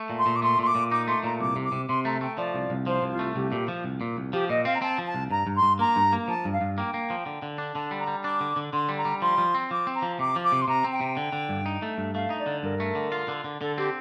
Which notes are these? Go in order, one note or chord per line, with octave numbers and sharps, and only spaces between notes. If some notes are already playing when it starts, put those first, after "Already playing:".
Already playing: A3
A#2
C6
A#2
D6
A3 C6
A#2 C6
D6
A#2
D#4 D6
A3 C6
A#2 A#5
C2 D6
C3
D6
C3
C3 C6
A3 A#5
A3 G5
F3 D5
C2
C2
F3 C5
C2
F4
A3
C2 G4
A#2 G4
F3
C2
A#2
C2
F3 G4
A#2 D#5
C4 F5
A#5
C4 A5
F3
A5
C2
G2 A#5
G2
C6
G2
A#3 A#5
G2
A#3
F3 A5
G2
F5
G2
A#3 G5
A#3
F3
D3
D3
D4
D3 A5
G3
A#5
G3
D4 D6
D3
D3
D3 C6
G3
A#5
G3
F3 C6
F3
C4
F3 D6
C4
A#5
F3
C3 D6
F3
D6
C3
C6
C3 A#5
C4
G5
C3
D3
D3
G2
D#4
A3
G2
A3 F5
D#4
D5
D3
G2 A#4
A3
D3
F4
D3
D3
D3 A4
C4 G4